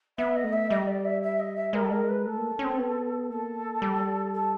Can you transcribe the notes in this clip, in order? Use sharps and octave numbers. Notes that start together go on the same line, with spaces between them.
B3 E5
D#5
A3
E5
G3 D#5
D5
E5
E5
D#5
E5
G#3 A#4
G3
A4
G#3 A#4
B4
A3 A4
A#3
C#4
C4
B3
A#3 A4
G3
A4